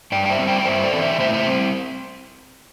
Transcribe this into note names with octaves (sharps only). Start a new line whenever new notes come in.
G2 D5 G5
G5
C5 E5
G3 C4
D5 G5
G5
G2 C5 E5
A4 D5
E3 C4
C5 E5
A2 C5 E5
C5 E5
G3 C4